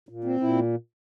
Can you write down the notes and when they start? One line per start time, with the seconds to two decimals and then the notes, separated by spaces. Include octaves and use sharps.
0.09 A#2
0.24 C4
0.40 A#2 E4